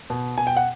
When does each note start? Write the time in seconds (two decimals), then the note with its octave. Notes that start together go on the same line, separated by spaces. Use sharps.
0.10 B2
0.37 B2 G#5
0.47 G5
0.57 F#5